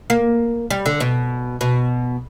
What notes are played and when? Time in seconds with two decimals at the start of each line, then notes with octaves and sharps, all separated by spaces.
0.10 A#3
0.70 G3
0.86 D3
1.00 B2
1.61 B2